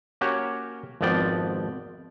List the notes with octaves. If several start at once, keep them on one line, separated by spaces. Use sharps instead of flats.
A#3 C#4 F#4 G4 C#5
G#1 F2 F3 B3 D5 G5